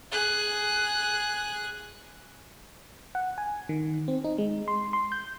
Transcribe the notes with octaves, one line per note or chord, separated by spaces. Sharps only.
G#4 F#6
F#5
G#5
D#3
C4
D#4
G#3
C6
C6
G6